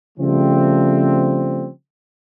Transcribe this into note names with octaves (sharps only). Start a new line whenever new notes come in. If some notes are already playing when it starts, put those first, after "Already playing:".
C#3 F3 G3 A3 C4